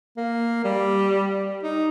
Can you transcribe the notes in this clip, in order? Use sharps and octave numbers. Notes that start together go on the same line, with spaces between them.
A#3
G3
D#4